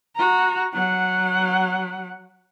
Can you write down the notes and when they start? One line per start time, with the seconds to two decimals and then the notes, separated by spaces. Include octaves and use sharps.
0.16 F#4 A#5
0.73 F#3 F#5